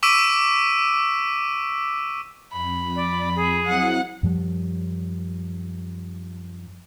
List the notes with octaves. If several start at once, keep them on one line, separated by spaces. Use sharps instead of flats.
C#6 D6 E6 B6 D7 D#7
F2 B5
D5
G#4
F#3 C4 E4 F#5
F#2 F3 G3